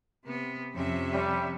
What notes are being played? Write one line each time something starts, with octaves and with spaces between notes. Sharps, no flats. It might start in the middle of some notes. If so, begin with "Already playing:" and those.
C3 B3
F2 C3 C#4 E5
G3